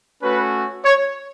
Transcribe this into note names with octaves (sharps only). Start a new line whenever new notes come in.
A3 C#4 F#4 B4
C#5